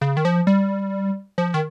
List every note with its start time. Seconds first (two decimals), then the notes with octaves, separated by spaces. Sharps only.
0.01 C#3
0.17 D#3
0.25 F3
0.47 G3
1.38 F3
1.54 D#3